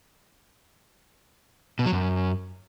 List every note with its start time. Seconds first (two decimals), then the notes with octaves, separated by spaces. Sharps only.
1.79 B2
1.86 F#3
1.93 F#2